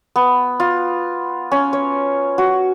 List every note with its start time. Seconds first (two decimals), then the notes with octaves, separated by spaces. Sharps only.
0.16 B3
0.60 F4
1.52 C#4
1.73 C#5
2.38 F#4